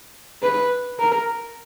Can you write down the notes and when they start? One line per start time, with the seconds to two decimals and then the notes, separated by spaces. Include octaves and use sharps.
0.43 B4
0.99 A#4